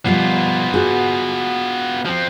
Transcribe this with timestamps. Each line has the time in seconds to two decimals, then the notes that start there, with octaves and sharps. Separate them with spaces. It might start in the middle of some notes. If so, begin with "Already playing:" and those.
0.06 B2 F3 G3 B3 F4
0.74 F#4 G#4
2.06 F3 C4